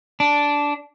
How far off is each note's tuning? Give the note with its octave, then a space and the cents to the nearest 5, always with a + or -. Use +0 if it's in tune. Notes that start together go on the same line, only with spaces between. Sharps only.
D4 -10